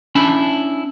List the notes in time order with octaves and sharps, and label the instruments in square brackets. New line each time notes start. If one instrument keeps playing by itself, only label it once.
[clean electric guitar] C#4 D4 E4 A5 B5